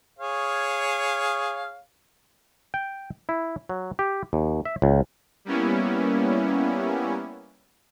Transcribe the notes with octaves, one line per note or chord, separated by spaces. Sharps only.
G#4 C#5 F5
G5
E4
F#3
G4
D#2
E5
C#2
G3 A#3 B3 C#4 E4